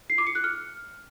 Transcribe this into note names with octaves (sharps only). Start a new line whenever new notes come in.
C7
D6
C#7
F#6
F6